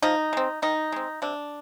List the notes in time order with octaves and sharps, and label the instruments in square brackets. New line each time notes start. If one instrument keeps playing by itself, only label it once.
[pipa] F3 D#4
G#3 C4
D#3 D#4
G#3 C4
C3 D4